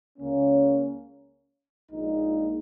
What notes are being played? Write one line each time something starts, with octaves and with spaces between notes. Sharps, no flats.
C#2 C#3 A#3 C#4
A#1 A#2 G#3 D#4